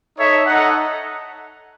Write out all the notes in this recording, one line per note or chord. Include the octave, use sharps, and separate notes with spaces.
D#4 A4 C#5 E5
D#4 A4 D#5 F#5